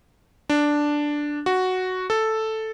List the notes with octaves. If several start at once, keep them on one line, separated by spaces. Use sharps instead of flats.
D4
F#4
A4